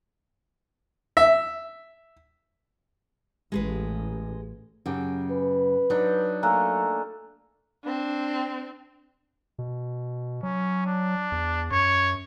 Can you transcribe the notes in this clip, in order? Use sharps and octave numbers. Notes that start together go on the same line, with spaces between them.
E5
A1 G#3 G#4 B4
F#2 C#3 G4
B4
F#3 D4 D#4
A3 A#3 A4 G#5 A#5 F#6
C4 D4
B2
F#3 C#4
D4
E2
F#2 C#5